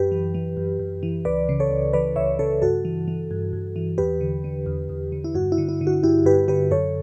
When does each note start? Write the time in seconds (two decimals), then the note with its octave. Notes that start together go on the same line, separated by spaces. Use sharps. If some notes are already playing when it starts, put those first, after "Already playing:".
Already playing: F#2 G4 B4
0.12 E3
0.34 E3
0.57 F#2
0.79 F#2
1.03 E3
1.25 C#2 B4 D5
1.49 C#3
1.60 A4 C#5
1.71 C#2
1.93 E3 B4 D5
2.16 C#2 C#5 E5
2.39 C#3 A4 C#5
2.62 G2 F#4 A4
2.85 E3
3.08 E3
3.31 G2
3.53 G2
3.76 E3
3.98 E2 G4 B4
4.21 D3
4.44 D3
4.66 E2
4.89 E2
5.12 D3
5.24 E4
5.34 G2 F#4
5.52 E4
5.58 D3
5.69 E4
5.81 D3
5.87 F#4
6.03 G2 E4 G4
6.25 G2 G4 B4
6.48 D3 G4 B4
6.71 F#2 A4 C#5